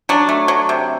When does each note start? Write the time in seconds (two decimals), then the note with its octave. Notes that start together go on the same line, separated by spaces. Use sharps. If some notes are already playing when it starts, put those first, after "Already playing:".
0.09 F#3 D4
0.29 A3
0.48 F#3
0.69 C3